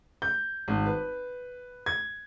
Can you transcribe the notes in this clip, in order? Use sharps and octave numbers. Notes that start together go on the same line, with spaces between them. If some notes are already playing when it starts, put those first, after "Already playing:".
G6
G#1
B4
G#6